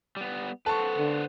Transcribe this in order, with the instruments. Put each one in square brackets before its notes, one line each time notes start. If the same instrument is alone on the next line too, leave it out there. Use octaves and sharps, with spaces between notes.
[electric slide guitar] G3 B3
[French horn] A4 [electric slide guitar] B4 C5 F#5 [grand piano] A5 C#6
[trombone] D3